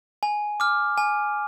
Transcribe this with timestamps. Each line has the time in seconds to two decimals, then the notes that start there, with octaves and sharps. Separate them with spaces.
0.23 G#5
0.60 D6 F6
0.98 G#5